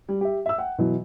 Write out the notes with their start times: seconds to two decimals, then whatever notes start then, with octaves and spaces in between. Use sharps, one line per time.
0.09 G3
0.21 G4 E5
0.46 E5 E6
0.58 F#5 G5
0.78 B2 E3 F#3